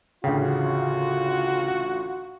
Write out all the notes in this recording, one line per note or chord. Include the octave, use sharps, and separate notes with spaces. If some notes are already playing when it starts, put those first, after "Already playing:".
A1 D2 C#3 F4 F#4 G5